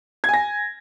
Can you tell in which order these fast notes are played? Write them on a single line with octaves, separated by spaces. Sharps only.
G#6 G#5 A#6